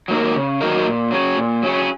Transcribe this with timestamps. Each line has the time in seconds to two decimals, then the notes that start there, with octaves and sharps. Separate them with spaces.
0.08 F#3 A#3 D#4 A#4
0.35 C#3
0.61 F#3 A#3 D#4 A#4
0.86 A#2
1.11 F#3 C#4 G#4
1.37 A#2
1.62 F#3 C#4 G#4